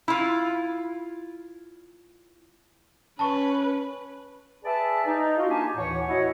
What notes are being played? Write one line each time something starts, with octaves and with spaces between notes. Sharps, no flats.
E4 F4
C#4 B4 A5 C#6
G#4 B4 D5 E5 A5
D#4
F4 F#4
A#3 D4 G4 G#5 A5
D#2 A2 E3 C#5 F#5
E4 F#4 C#5 D#5 F#5